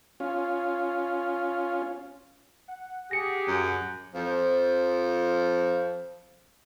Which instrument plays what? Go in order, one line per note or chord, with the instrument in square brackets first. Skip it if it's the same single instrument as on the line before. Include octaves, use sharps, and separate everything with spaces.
[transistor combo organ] C#4 F4
[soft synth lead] F#5
[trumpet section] G4 G#4 [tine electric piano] A#6 C#7
[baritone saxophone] F#2
[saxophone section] F2 F3